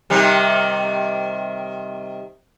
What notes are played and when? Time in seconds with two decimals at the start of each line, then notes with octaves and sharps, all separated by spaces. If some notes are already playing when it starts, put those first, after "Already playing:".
0.10 C3 D#3 G3